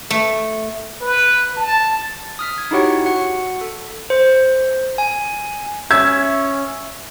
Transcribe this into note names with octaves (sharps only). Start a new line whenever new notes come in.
A3
B4
A5
D#6 F6 B6
G#6
D#4 E4 F#4 G4 C#5 F#5
F#4 F#5
A4
C5
G#5
C#4 E5 G#6